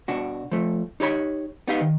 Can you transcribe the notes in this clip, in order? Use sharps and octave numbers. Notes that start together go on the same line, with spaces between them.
B2 D4 F#4
F3 A3
D#4 G4 C#5 B5
B3 D#4 G4 F5
D#3